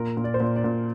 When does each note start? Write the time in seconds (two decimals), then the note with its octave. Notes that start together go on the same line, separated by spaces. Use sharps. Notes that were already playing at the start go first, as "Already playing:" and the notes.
Already playing: A#2 A#4
0.17 A#2
0.24 D5
0.34 C5
0.40 A#2 D5
0.56 D5
0.64 A#2